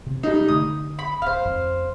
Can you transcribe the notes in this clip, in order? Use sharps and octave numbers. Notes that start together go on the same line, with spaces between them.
C3
G3 D#4
D3 A3 D#6
B5
D1 C5 F5
F2